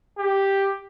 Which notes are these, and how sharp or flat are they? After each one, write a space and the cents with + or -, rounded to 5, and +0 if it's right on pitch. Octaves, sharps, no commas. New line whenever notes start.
G4 +0